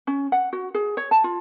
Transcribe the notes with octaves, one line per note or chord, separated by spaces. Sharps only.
C#4
F#5
F#4
G#4
C#5
A5
F4